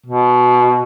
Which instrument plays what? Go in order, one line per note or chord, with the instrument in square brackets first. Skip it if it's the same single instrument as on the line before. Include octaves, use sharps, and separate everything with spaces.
[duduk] B2